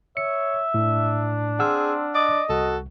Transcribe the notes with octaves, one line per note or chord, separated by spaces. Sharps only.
C#5 E5 C#7
A2 D4
C4 G#4 F#5 E6 F6
D5 D#5
C2 F#4 A4